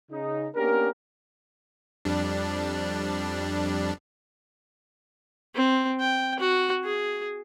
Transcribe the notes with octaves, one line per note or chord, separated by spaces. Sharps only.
C#3 D#4
A#3 B3 C#4 D4 G4 A#4
F2 G3 D4
C4
G5
F#4
G#4